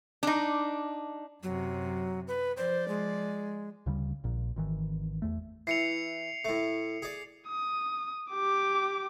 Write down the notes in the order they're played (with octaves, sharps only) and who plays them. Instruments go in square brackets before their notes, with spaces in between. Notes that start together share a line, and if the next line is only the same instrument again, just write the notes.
[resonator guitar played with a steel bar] D4 D#4
[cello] F#2 C3 [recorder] F#3
[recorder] B4
[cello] F3 D5 [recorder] C5
[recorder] G#3
[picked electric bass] D2 C#3 F#3 G3
A#1 A#2
G#1 D#3 E3
E2 A3
[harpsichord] E3 [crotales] C7 C#7 F7
[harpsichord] A2 A3
G#4 D5
[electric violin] D#6
G4 D6